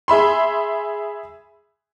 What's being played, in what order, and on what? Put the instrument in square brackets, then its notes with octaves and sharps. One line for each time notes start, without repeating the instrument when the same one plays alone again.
[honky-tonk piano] G#4 E5 B5 C6